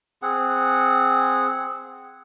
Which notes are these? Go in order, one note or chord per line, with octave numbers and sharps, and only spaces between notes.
C4 G#4 F#5